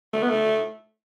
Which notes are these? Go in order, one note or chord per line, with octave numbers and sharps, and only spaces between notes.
A3
B3
A3